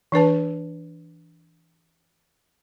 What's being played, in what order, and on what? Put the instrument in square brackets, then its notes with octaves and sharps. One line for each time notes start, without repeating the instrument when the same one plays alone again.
[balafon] E3 D4 B4 A5